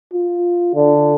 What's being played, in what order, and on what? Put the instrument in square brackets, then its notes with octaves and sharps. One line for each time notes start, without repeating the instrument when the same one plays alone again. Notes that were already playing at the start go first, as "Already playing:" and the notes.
[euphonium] F4
D3